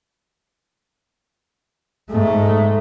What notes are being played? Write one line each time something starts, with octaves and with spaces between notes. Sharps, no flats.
G#2 A3